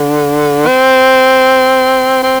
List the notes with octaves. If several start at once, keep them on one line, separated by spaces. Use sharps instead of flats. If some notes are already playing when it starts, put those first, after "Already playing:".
Already playing: D3
C4
C4